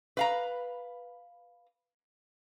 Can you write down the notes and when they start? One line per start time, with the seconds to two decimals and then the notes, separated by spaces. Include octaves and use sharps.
0.17 B4 F5 A#5